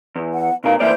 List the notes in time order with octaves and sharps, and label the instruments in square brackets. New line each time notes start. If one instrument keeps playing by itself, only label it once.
[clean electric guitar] E2
[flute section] F#5
[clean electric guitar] B2 A#4 [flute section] D#4 F5
[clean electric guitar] E3 A#3 D5 [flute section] C5 E5 G6